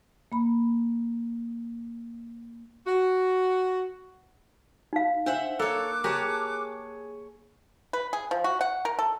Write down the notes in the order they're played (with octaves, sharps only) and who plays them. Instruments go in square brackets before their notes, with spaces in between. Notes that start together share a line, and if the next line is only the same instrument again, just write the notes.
[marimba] A#3 B5
[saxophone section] F#4
[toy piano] D#4 F5
[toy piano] D4 [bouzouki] C5 E5 F#5
[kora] A#3 [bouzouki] A4 C#5 [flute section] D6 E6 F#6
[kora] G4 A#4 [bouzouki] G#4 C#5 A5
[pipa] B4
G#4
F3
F#4
F#5
A#4
A4